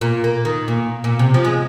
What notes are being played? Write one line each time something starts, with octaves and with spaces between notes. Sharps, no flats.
A#2
A#3
D#3
A#2
A#2
C3
F3
G#3